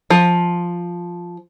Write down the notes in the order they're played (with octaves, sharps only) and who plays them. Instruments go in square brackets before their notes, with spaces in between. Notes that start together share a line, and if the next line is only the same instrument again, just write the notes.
[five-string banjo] F3